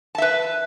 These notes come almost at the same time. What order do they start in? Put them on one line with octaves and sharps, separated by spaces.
A5 E5 B4